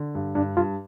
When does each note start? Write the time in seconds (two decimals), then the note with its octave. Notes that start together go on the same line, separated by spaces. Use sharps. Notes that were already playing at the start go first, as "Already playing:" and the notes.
Already playing: D3
0.15 G2
0.35 G2 D4
0.57 G2 F4